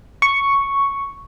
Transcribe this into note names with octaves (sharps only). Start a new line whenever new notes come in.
C#6